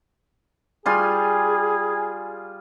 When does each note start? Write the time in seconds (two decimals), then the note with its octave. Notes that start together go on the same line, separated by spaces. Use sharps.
0.86 G3 F4 G#4 G#5